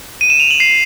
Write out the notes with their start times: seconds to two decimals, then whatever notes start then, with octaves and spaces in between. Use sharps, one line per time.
0.21 D#7
0.30 E7
0.40 F7
0.51 F#7
0.60 C7